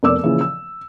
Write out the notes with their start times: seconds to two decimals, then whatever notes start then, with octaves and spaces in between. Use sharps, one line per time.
0.03 F1 B2 A#4 D5 D6 E6
0.23 A#2 C#3 E3 F3
0.41 E6